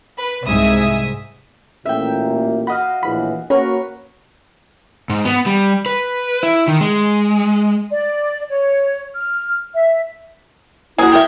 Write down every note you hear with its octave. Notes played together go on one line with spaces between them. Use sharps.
B4
C2 G#2 E5 G#5 D#6
A1 A#2 A#3 E5 G5
F#4 D#5 F5 B5
A#1 A2 E3 B5
A#3 C#4 F#4 A#4 B4 C#5
G#2
B3
G3
B4
E4
D#3
G#3
D5
C#5
F6
E5
A#3 E4 F#4 G#4
G4 A#4 E5